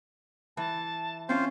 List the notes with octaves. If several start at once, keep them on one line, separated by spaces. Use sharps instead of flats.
E3 A5
C4 C#4 F4 C5